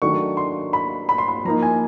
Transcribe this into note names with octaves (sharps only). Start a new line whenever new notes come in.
D#3 F#3 A3 D4 C#6
C6
B5
B5
C6
B5
F3 A#3 D#4 A#5
G#5